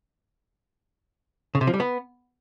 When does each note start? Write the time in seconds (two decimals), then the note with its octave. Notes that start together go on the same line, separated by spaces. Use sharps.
1.55 C#3
1.61 C3
1.67 F3
1.74 G3
1.80 B3